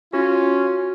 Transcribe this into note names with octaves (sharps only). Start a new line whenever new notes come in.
C#4 F4 F#4